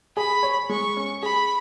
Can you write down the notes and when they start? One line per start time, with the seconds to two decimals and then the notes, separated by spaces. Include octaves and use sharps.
0.17 G#4 B5
0.43 C#5
0.69 G#3 C#6
0.97 C#4
1.23 G#4 B5